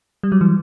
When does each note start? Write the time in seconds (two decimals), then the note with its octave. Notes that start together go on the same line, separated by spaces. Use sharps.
0.23 G3
0.32 F#3
0.41 E3